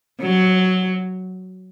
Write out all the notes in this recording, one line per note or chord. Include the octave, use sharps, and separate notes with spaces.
F#3